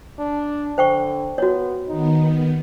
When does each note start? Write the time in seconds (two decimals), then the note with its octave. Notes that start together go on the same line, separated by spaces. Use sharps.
0.19 D4
0.78 D3 C5 G5 C#6
1.38 B3 F#4 C#5
1.88 D#3 B3 D#4